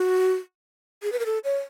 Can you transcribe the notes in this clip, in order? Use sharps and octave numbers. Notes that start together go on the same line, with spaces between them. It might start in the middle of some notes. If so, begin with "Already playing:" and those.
Already playing: F#4
G#4
B4
A#4
A4
C#5